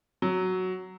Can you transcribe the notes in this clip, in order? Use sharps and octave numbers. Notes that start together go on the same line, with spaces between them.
F#3